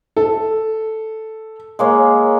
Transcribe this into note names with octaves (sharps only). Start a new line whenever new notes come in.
A4
G#3 A#3 C#5